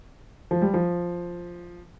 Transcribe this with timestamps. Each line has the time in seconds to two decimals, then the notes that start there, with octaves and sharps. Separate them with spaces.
0.51 F3
0.62 G3
0.74 F3